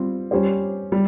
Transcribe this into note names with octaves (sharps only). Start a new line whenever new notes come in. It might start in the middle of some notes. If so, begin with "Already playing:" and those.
Already playing: G3 C4 F4
G3 C#4 G4 C5
G3